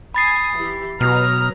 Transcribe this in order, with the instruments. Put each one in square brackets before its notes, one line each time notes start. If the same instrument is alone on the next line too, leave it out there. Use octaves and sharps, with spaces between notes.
[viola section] G#5 [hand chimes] B5 A6 C7 [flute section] D#6
[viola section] E3 E4 G4
[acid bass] B2 [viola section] F#3 B4 A#5 [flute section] D#6 F6